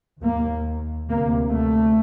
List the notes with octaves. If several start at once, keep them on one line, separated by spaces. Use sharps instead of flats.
D#2 A#3
D2 C3 A#3
A3